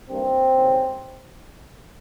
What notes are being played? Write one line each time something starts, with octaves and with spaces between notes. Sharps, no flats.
G2 D#3 A#3 C4
D#2 C#3 G#3